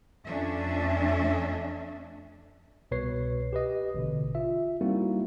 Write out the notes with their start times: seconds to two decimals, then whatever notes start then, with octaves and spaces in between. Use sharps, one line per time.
0.24 F2 A3 C#4 D4 E5
2.91 C2 B2 B4 C#5 C7
3.53 G4 B4 D#5
3.94 A1 B2 D3
4.35 F4 E5
4.81 G3 A#3 C4 D#4 E4 F#4